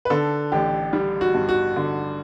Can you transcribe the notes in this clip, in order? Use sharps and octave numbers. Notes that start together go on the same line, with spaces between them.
B4
D3 A4
A1 G4
G3
F#4
G2
F#4
D3